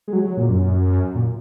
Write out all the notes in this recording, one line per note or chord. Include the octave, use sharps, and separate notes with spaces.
G#3
F#3
F#3
A#2
F#2
A#2